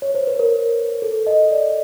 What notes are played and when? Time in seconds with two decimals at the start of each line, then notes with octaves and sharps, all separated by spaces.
0.02 C#5
0.14 C5
0.27 B4
0.40 A#4
1.02 A4
1.27 D#5
1.51 D5